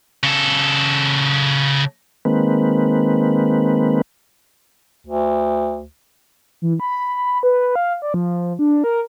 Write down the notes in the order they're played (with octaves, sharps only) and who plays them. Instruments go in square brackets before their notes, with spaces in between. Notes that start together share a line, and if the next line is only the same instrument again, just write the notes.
[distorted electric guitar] C#3 A4
[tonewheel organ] D#3 G#3 A#3 C4 B4
[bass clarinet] D2
[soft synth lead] E3
B5
B4
F5
D5
F3
D4
A#4